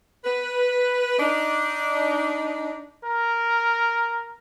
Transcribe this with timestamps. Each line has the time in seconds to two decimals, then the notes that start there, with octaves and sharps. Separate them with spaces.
0.24 B4
1.19 D4 D#4
3.05 A#4